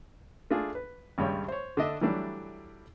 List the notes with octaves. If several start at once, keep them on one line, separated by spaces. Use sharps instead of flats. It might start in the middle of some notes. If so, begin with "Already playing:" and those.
A3 D4 F4 G#4
B4
G#1 G2 C#3 G3 C#5 G5
C5 C#5
D3 D4 D#5 E5
E3 F#3 G3 A3 D4